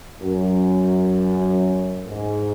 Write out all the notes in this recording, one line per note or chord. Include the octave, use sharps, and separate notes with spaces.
F#2
G#2